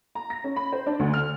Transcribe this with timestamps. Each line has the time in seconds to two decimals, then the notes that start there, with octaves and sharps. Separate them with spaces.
0.15 A#5
0.30 A#6
0.44 C#4
0.56 B5
0.72 C5
0.86 D4
0.99 D2
1.14 F6